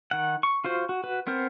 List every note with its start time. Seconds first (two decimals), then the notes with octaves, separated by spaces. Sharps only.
0.11 D#3 F#5
0.43 C#6
0.64 F4 F#4 C5
0.89 F#4
1.04 F#4 B4
1.27 B3 C4 A#4 C5